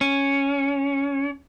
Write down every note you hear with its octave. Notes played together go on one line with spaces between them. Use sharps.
C#4